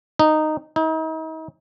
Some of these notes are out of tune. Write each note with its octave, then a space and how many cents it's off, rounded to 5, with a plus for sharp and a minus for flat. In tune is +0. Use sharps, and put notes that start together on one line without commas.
D#4 -10
D#4 +40